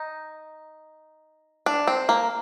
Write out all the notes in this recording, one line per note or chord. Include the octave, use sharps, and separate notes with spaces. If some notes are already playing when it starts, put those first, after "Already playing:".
Already playing: D#4
D4
C4
A#3